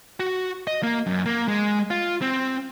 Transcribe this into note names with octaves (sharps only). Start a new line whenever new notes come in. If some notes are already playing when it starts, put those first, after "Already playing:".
F#4
D#5
A#3
F#2
A#3
G#3
F4
C4